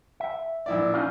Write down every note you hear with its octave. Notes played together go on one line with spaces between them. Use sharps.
E5
A#1 E4 D5
C#4 D#4 F4